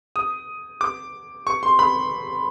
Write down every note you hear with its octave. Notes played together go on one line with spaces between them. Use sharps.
D#6
D6
C#6
C6
B5